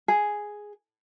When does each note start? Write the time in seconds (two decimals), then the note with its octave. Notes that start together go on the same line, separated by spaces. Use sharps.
0.08 G#4